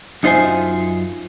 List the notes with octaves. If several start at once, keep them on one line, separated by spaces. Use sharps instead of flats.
F#2 D#4 F4 C5 E5 G#5